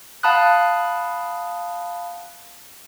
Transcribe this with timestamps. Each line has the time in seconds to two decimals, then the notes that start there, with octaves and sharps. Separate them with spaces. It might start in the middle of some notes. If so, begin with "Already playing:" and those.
0.23 F5 F#5 A5 B5 D#6 F#6